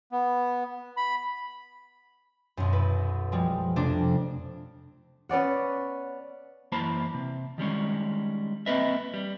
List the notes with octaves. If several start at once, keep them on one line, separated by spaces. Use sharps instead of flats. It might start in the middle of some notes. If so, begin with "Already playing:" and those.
B3
B5
B1 F#2
E4 B4
F3 G3 G#3
F2 C3 A3 D4
B3 C#4 D5 F#5
F#2 E3 A#3 C5 A5 B5
C3
D#3 G3 G#3 C#4
A#3 C4 B4 D#5 E5
G3